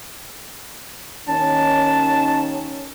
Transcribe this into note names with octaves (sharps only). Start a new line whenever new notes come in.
D#2 D#3 C#4 A5